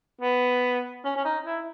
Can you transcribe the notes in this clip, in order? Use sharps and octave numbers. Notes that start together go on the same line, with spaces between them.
B3
C#4
C#4
D#4
E4